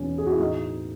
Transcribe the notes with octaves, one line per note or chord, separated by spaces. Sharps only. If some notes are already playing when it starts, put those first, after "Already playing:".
Already playing: E2 B2 C#4 D#4
G#4
F#4
E4
A2 D#4